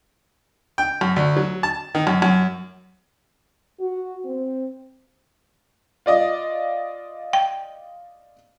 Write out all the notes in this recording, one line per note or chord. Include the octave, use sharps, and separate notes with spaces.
G5
F#2
D2
F#3
A5
D#3
F#2
F#2
F#4
C4
F4 D5 D#5
G5